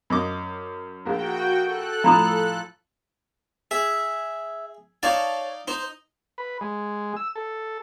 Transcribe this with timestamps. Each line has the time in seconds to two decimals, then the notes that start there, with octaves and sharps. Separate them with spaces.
0.10 F#2 D#5 D6
1.05 A#1 F#4 A#4 G5
1.63 A4 F#6
2.04 A2 F3 A#5 B5 D#6
3.71 G#4 E5
5.03 D#4 C#5 D5 F5 A5
5.68 D#4 C5
6.38 B4
6.61 G#3
7.16 E6
7.36 A4